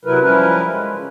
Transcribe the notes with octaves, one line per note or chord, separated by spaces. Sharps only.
C3 F#3 E4 A#4 B4
F3 G3 C#4 E4 A#4 B4
G#3
C#3